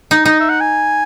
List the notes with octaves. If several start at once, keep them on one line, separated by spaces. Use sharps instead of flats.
D#4
D#4 D#5
E5
F#5
G#5